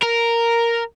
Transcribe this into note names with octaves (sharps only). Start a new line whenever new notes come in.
A#4